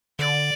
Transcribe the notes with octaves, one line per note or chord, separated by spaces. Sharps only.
D3 D5